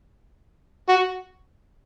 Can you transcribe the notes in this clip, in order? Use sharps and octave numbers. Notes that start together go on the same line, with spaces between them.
F#4